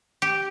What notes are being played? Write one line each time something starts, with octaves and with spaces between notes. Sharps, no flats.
G4